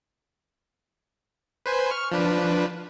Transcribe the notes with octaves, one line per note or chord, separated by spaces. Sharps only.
B4 C5 G#5
C#6 F6
F3 D4 B4